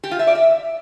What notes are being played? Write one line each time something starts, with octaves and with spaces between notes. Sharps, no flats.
G4
F4
E5
D5
E5